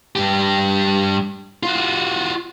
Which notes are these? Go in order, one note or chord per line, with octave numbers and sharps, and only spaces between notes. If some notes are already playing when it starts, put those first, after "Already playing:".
G2 G4
F4 F#4